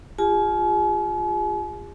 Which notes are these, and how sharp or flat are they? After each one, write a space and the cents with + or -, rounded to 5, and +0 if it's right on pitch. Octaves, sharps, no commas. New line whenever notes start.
F4 +0 G#4 -40 G#5 +45